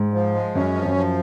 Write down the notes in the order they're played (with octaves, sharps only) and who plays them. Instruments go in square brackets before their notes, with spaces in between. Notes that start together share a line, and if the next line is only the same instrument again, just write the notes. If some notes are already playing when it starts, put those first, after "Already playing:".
Already playing: [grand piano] G#2
[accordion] F3
G#3
[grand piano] F#2 [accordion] C#4
[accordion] F3
[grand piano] F#2
[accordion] F3